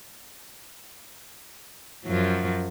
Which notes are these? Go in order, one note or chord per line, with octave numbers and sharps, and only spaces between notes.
F#2 F3 F#3